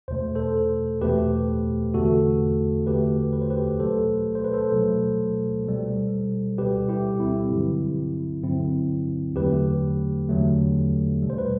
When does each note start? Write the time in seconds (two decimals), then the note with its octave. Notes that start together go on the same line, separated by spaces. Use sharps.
0.08 E2 B2 A3 C5
0.35 A4 C5
1.01 E2 B2 A3 G4 B4
1.94 E2 D3 A3 F#4 A4
2.87 E2 D3 A3 G4 B4
3.33 B4
3.42 C5
3.50 G4 B4
3.79 B2 F#3 A3 A4 C5
4.35 C5
4.45 B4
4.53 A4 C5
4.73 B2 F#3 A3
5.65 B2 G3
6.58 B2 G3 G4 B4
6.89 E4 G4
7.20 C4 E4
7.51 G2 D3 F#3
8.43 G2 D3 F#3 C4 E4
9.36 E2 D3 F#3 A3 G4 B4
10.29 E2 D3 F#3 A3
11.22 B2 G3
11.30 C5
11.38 B4